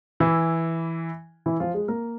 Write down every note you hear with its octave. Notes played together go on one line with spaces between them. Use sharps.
E3 E4
E3 E4
F3 F4
G#3 G#4
A#3 A#4